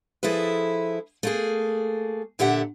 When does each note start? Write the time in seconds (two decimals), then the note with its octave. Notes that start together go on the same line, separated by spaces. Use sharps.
0.23 F3 E4 G#4 A4 B4
1.23 A3 A#3 G#4
2.39 A#2 D3 G4 E5 F#5